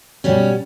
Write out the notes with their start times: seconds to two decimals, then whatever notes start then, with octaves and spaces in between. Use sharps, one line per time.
0.24 B2 G3 C#4